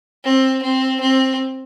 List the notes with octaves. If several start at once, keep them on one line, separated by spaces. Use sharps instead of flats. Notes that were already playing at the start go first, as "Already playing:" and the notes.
C4
C4
C4